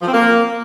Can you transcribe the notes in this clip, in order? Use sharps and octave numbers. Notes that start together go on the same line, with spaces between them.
F3
C4
A#3